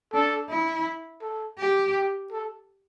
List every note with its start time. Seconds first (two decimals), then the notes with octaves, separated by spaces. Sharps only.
0.13 D4 A4
0.49 E4
1.22 A4
1.59 G4
1.95 G4
2.32 A4